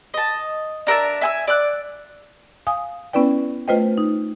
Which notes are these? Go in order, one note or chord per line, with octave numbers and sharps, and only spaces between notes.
D#5 A5
D4 A#4 E5 A5
E5 G#5 E6
D5 E6 F#6
F5 G#5 D#6
B3 C#4 E4 B4 D5 G5
A3 F4 B4 C5 D#5 G5
D#4